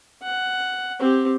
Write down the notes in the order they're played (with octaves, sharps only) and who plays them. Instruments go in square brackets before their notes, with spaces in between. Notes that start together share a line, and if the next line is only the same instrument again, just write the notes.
[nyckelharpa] F#5
C4 G4